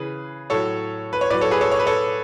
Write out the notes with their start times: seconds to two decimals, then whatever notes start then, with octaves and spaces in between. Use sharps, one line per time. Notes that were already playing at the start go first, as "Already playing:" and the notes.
Already playing: C#3 E3 G#4 B4
0.50 A2 F#3 A4 C#5
1.13 B4
1.21 C#5
1.30 A2 F#3 B4 D5
1.41 A4 C#5
1.51 G#4 B4
1.61 A4 C#5
1.72 C#5
1.80 B4
1.87 A4 C#5